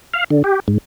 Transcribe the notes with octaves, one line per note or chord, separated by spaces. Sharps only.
F5
D3
G4
G#2